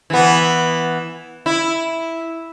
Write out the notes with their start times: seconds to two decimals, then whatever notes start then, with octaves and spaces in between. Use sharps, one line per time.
0.10 E3 B3
1.46 E4